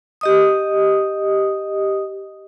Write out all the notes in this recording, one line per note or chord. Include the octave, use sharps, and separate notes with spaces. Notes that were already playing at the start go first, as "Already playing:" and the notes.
G4 D#5 D#6